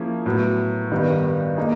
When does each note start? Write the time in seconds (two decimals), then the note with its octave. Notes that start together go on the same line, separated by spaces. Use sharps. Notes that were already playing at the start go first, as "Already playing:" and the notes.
Already playing: F3 A#3 C#4 E4 G#4
0.26 A2 F#3 B3
0.92 G2 D#3 G3 B3
1.57 A#3 D#4 G#4